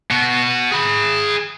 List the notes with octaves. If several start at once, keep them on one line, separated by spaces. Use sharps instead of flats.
B2 F#4
G#4 B5